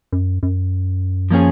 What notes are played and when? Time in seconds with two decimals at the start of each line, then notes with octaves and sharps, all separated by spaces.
0.12 F#2
0.43 F#2
1.31 F3 A#3 C#4 G#4